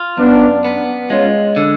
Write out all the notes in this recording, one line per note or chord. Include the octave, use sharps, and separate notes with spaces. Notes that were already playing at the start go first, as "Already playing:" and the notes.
Already playing: F4
F#2 B3 D4
B3
G#3 C#4 F4
D3